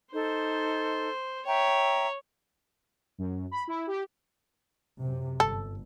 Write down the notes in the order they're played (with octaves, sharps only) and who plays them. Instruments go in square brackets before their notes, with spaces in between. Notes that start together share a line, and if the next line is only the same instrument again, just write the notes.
[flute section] D#4 A4 [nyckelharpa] C5
[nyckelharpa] C#5 [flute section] E5 G5 A#5
[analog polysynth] F#2
B5
E4
G4
[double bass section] F#2 C3
[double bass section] G1 [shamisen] A4